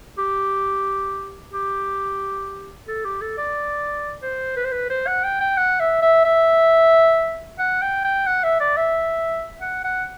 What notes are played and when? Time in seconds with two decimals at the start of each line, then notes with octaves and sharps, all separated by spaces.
0.18 G4
1.53 G4
2.88 A4
3.04 G4
3.22 A4
3.38 D5
4.22 C5
4.56 B4
4.64 C5
4.72 B4
4.90 C5
5.07 F#5
5.24 G5
5.40 G5
5.57 F#5
5.80 E5
6.02 E5
6.25 E5
7.59 F#5
7.82 G5
8.04 G5
8.26 F#5
8.44 E5
8.60 D5
8.77 E5
9.61 F#5
9.84 F#5